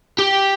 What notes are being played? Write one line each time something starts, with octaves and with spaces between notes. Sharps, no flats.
G4